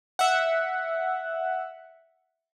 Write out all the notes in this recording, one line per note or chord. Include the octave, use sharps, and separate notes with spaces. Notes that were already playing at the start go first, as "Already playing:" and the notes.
E5 F#5